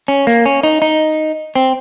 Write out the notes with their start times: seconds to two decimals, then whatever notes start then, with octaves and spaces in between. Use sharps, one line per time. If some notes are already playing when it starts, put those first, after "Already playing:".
0.08 C#4
0.27 A#3
0.46 C#4
0.63 D#4
0.82 D#4
1.55 C4